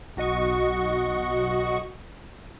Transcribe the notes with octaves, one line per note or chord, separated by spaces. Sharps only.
B1 F#4 D#5 C#6